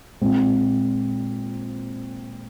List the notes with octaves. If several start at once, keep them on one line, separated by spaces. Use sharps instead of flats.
A#2 G#3 C4